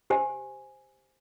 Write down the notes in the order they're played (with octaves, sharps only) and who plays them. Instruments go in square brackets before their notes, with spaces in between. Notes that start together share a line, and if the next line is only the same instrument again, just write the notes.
[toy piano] G4 C5 G#5